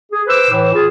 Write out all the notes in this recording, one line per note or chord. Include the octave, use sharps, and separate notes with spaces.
G#4
B4 C5 D6 E6
A2 E3
F4 G#4